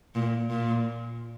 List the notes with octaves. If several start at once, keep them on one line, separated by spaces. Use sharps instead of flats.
A#2
A#2